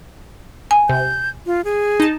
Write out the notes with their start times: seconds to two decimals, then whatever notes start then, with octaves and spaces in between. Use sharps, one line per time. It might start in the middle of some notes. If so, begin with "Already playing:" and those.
0.71 G#5
0.89 C3 G6
1.46 F4
1.65 G#4
2.00 D#4 A5